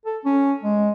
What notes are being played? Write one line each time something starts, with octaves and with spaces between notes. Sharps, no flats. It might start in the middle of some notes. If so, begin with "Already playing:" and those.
A4
C#4
G#3